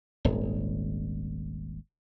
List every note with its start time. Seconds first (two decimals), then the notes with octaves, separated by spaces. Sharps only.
0.25 D#1 G#1